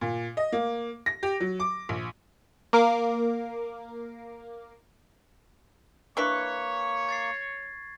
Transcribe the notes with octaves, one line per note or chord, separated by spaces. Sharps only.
A#2
D#5
A#3
A#6
G4
F#3
D6
A#1
A#3 A#4 D6 C7
A#3 D4 E4 B4 C#5 C#6 B6
G#6 A6 C7